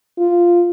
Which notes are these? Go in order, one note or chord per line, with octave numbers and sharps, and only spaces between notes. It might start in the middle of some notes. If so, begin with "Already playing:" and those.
F4